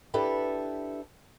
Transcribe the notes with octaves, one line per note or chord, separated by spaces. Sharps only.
D4 E4 G4 A4 B4